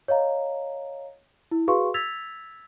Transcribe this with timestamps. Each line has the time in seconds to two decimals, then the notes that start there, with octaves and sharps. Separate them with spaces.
0.08 C#5 D#5 F5 A#5
1.51 E4
1.68 F#4 G#4 B4 F5 C6 C#6
1.94 E6 G#6 A6 B6 F7